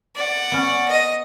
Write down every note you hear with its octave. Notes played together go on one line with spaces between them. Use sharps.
D5 F#5
B3 C#4
D#5